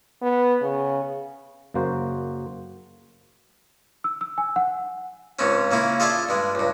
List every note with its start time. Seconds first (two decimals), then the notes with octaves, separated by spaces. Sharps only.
0.22 B3
0.62 C#3
1.74 F#2 C#3 A#3 F#4 C5
4.04 E6
4.21 E6
4.38 G#5
4.56 F#5
5.39 C#2 G#2 C#3 C4 C#4
5.71 C#3 A#3 C#4 E4
6.00 F4 G#4 A4 C5 D5 E5
6.29 G2 G#3
6.55 C#2 G2